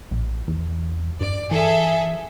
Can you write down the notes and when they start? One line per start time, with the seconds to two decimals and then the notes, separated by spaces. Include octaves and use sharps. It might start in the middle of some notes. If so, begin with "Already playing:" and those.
0.11 A#1
0.48 E2
1.21 G2 D5
1.51 E3 G#4 A4 E5